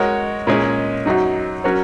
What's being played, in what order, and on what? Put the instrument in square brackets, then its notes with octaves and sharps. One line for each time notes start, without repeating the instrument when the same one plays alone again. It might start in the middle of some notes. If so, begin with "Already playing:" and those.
Already playing: [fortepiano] G#3 F#4 A#4 C#5
A#2 G#3 C#4 G#4
F#2 F#3 D#4
F#3 C#4 F#4 A#4 C#5